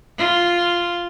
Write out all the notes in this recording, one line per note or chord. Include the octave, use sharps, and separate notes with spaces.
F4